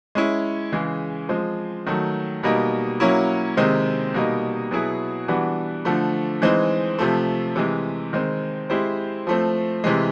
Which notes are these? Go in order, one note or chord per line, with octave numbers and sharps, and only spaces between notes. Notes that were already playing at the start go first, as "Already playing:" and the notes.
G#3 C#4 E4
C#3 E3 G#3
F3 G#3 C4
D#3 F#3 A3
B2 G3 A#3 D#4
F#3 A#3 C#4 E4
C3 D#3 G#3 C4
B2 G3 A#3 D#4
B2 F#3 B3 E4 G#4
E3 G3 B3 D4 F#4
D3 F3 A3
E3 G#3 C4 D#4
C3 F3 A3
C3 E3 G#3
D#3 G#3 C4
G#3 C4 E4 G4 C5
F3 A3 C4
C3 E3 G#3